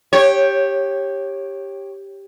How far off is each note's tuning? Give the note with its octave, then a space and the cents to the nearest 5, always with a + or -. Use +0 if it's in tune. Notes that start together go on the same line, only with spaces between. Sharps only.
G4 +5 C#5 -15